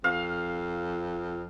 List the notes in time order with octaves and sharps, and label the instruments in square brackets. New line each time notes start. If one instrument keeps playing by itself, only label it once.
[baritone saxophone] F2 [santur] F5